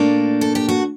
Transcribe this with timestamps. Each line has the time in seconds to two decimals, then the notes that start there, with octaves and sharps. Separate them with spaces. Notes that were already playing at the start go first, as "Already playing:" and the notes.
Already playing: A#2 A3 A#3 D4
0.41 A4
0.55 G4
0.69 F#4